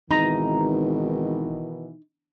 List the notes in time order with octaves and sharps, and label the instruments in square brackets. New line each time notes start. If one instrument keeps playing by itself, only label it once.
[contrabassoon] G#1 [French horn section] B2 D#3 E3 [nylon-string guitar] D#4 [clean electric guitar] A#5